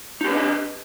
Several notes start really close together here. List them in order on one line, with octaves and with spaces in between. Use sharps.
D#4 G4 B4 D4 D#5